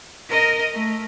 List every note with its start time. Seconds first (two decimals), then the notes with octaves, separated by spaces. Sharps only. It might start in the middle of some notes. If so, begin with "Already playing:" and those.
0.29 A#4 D#5
0.74 A3